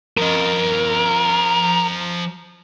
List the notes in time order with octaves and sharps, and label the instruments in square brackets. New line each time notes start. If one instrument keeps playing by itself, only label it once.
[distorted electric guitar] F3 D#5 [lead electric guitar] A#4